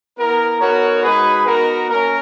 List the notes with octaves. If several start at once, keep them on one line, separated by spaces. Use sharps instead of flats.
B3 E4 A#4
B3 D#4 F#4 A#4 C#5
G#3 D#4 F#4 G#4 B4
B3 D#4 F#4 A#4
A#3 C#4 A#4